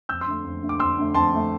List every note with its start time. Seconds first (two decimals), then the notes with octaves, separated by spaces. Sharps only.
0.09 F2 E6 G6
0.21 C6 E6
0.26 D3 A3
0.44 F2
0.62 D3 A3
0.69 D6
0.80 F2 C6 E6
0.97 D3 A3
1.14 F2 A5 C6
1.32 D3 A3